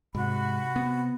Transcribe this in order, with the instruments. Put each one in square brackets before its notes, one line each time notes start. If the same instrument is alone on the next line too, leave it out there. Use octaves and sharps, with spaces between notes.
[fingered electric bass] G#2 [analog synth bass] C3 [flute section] F#4 B5
[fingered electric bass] B3